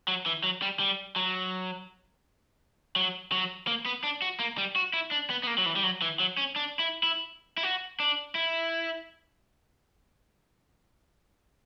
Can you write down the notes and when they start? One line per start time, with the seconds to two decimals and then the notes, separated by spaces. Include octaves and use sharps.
0.08 F#3
0.26 E3
0.44 F#3
0.62 G3
0.80 G3
1.16 F#3
2.96 F#3
3.32 F#3
3.67 A#3
3.86 B3
4.04 D4
4.22 F#4
4.40 A#3
4.58 G3
4.76 F#4
4.93 E4
5.11 D4
5.30 B3
5.43 B3
5.47 A#3
5.58 F#3
5.66 E3
5.76 G3
5.84 F#3
6.02 E3
6.20 F#3
6.37 C#4
6.56 D4
6.79 E4
7.03 E4
7.57 E4
7.63 F#4
8.00 D4
8.35 E4